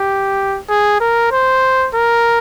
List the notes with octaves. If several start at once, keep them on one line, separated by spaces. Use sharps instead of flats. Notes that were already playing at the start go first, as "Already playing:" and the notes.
Already playing: G4
G#4
A#4
C5
A#4